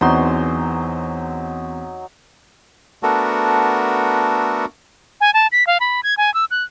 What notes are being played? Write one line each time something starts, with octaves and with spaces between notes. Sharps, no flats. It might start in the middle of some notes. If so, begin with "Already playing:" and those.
E2 F#3 C4 D#4 C6
A3 B3 D4 F#4 A4 A#4
G#5
A5
B6
F5
B5
G#6
G#5
E6
F#6